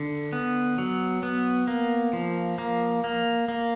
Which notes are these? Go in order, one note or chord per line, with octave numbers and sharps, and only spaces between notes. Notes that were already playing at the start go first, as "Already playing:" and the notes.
Already playing: D3
B3
F#3
B3
A#3
F3
A#3
A#3
A#3